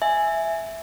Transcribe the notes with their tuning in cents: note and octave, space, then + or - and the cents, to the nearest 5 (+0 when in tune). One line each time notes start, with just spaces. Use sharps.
E5 +0 G#5 +0